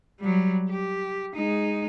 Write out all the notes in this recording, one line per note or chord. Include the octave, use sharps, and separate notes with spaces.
F#3 G3
G4
G#3 D#4